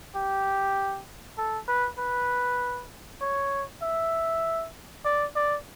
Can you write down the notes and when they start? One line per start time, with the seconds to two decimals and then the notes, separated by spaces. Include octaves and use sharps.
0.15 G4
1.38 A4
1.68 B4
1.98 B4
3.21 C#5
3.82 E5
5.05 D5
5.36 D5